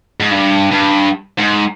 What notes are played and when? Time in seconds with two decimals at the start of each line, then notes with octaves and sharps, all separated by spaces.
0.20 G#2
0.31 G2
0.72 G2
1.38 G#2